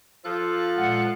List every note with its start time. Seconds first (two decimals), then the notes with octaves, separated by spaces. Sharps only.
0.25 F3 F4 A4 F#6
0.77 A#2 G#3 F#5